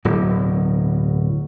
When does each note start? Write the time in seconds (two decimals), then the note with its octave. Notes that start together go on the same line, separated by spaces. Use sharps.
0.05 D1 B2 F#3